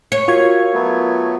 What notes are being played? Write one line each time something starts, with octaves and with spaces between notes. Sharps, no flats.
C#5
F4 F#4 A#4 F5 C#6 G#6
F#3 A3 B3